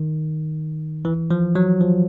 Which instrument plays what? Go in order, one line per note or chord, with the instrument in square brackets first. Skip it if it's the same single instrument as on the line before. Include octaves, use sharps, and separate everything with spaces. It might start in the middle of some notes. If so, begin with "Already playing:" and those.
Already playing: [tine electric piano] D#3
E3
F3
F#3
F3